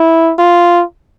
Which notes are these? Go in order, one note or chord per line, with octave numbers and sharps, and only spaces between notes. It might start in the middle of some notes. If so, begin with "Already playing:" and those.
Already playing: E4
F4